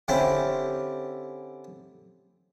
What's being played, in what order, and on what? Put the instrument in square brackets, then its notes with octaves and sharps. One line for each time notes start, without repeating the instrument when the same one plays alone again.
[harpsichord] D3 C4 C#4 E4 G4